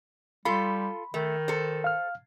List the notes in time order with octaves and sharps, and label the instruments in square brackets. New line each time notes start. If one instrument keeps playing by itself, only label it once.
[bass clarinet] G3 [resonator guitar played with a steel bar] F4 A4 [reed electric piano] B5 C6
[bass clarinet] D#3 [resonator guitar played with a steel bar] A3
[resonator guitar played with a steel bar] A4 C5
[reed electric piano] F5 F6